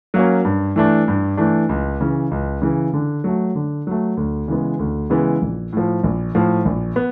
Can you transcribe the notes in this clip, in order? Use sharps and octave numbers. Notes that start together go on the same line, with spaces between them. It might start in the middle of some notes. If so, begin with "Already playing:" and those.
F#3 A#3 C#4
G2
E3 A3 D4
G2
E3 A3 D4
C#2
C#3 E3
C#2
C#3 E3
D3
F#3 A3
D3
F#3 A3
D2
C#3 E3 G#3 B3
D2
C#3 E3 G#3 B3
A#1
A2 F3
A#1
A2 F3
A#1
B3